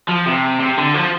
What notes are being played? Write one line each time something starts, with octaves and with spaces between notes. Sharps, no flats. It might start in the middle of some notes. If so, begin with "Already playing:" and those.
F3
C3
C3
D3
F3